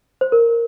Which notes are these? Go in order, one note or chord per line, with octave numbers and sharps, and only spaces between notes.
C5
A#4